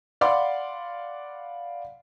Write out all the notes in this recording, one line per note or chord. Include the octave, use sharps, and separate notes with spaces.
D5 F5 F#5 B5 C6 D6